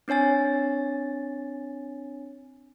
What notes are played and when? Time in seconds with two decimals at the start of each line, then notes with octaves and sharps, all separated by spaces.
0.08 C4 D4 C#5 G#5 A6